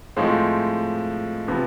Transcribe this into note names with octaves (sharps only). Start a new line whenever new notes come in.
A2 F3 G#3 C4 F4
C3 F3 B3